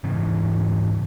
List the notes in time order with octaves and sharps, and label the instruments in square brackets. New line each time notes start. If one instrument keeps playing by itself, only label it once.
[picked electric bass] G#2 C#3 E3